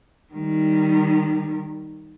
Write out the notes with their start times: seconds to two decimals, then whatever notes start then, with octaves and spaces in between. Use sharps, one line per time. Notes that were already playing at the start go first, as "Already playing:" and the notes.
0.33 D#3 G3